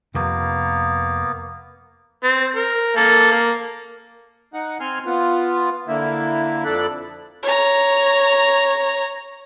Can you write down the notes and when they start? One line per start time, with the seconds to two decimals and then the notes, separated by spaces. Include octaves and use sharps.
0.15 F2 C3 A#3 B3
2.24 C4
2.56 A#4
2.97 A#3 A4
3.31 A#3
4.54 D#4 F#5
4.80 C4 G#5 C6 F6
5.05 B3 F4
5.88 D3 A#3 E4
6.64 F2 D4 A4 B5 F#6
7.43 C#5 A#5